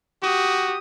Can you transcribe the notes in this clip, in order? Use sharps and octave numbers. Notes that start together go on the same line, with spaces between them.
F#4 G4 D#6